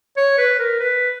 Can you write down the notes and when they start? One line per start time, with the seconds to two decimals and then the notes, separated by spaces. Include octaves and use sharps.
0.17 C#5
0.38 B4
0.59 A#4
0.80 B4